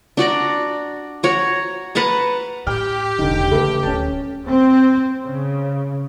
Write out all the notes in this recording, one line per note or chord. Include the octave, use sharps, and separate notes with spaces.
D4 F#4 D5 A#5
F#4 C#5 A#5
B4 F#5 A5 A#5
A2 G4 G5 F6
E1 A#1 G#2 D3
E2 C#3 A3 B4
D1 C#4 A5
C4
C#3